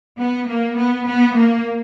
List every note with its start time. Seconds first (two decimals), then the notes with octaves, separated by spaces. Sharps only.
0.18 B3
0.48 A#3
0.77 B3
1.06 B3
1.35 A#3